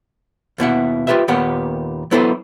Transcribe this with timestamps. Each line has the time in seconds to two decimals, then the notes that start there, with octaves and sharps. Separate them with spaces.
0.58 D#2 B2 E4 F#5
1.07 F4 G4 B4 C5 E5
1.28 D#2 A#2 B3 G4 F#5
2.11 F#3 B3 E4 A4 B4 C5